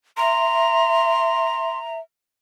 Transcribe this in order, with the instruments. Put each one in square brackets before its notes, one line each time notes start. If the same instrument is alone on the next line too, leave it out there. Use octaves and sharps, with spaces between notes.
[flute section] E5 [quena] A#5 [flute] C6